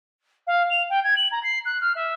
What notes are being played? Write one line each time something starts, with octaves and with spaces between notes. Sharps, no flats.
F5
F7
G5
G#6
F#7
A#5
C7
F#6
F6
E5